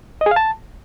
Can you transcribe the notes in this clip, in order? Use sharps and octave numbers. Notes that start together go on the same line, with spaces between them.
D#5
G#4
F5
A5